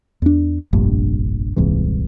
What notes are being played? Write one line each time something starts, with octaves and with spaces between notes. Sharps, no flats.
E2 D4
F1 A#1 G2
D#1 C2 G#2 E3